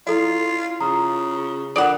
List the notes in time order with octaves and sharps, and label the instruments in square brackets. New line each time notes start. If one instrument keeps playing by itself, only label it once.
[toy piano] E4 A4 D5 [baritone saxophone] F4
[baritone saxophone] C#3 [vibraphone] F4 D#6 [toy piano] A#5
[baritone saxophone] D3 [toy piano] F4 A#4 D#6 [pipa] D5 F#5